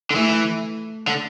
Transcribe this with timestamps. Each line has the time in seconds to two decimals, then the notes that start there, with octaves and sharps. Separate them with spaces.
0.11 D3
0.15 E3 A3
1.07 D3